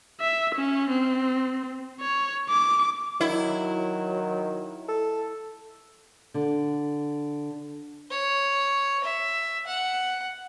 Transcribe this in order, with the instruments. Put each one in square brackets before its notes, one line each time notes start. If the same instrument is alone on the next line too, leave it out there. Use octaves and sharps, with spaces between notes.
[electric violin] E5
C#4
C4
C#5
D6
[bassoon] D#3 [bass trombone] F#3 [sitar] E4
[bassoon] A4
[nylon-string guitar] D3
[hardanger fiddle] C#5
E5
F#5